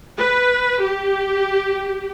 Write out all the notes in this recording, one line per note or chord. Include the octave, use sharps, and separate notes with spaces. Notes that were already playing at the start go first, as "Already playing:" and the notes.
B4
G4